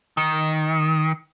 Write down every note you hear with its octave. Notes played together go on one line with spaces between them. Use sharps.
D#3